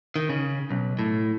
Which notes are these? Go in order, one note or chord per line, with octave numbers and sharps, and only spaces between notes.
D#3
C#3
B1
A2